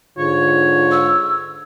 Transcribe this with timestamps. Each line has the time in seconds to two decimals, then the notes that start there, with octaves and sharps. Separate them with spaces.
0.18 G#2 D3 F4 C#5
0.92 E6